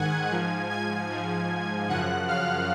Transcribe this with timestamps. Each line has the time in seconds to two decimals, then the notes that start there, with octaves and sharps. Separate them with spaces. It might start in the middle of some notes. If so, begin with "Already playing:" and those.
Already playing: G#2 D#3 F#5 G#5 F#6 G#6
0.30 G#2 F3
0.70 G#5 G#6
1.10 G#2 F3
1.88 F#2 C#3 F3 F#5 F#6
2.27 F5 F6